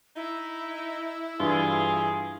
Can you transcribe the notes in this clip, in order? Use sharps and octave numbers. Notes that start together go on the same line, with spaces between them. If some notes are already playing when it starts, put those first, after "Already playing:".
D#4 E4
G2 E3 F4 G#4